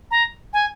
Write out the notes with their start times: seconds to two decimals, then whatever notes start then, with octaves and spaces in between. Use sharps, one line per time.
0.11 A#5
0.53 G#5